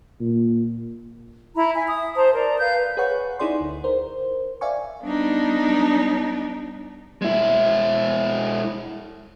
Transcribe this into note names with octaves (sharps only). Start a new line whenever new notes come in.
A#2
E4 A#5 B5
E5 G#5
D#6
C5 A5 A#5
A#4 D5 A#5
B4 F5 G6
G#4 B4 C#5 F#5 C#6
D#4 E4 G#4 D5 C6
D2
A#4 C5
D5 E5 F5 G#5 C#6
G3 B3 D4 D#4
G#3 E4